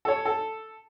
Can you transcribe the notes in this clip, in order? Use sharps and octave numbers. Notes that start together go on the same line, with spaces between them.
A4 C#5
A4